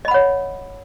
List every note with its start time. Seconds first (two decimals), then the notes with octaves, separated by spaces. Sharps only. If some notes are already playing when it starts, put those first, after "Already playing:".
0.05 D#5
0.08 B5
0.11 F#5
0.14 C#5